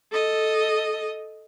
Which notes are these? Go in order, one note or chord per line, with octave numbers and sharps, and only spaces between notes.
A4 D#5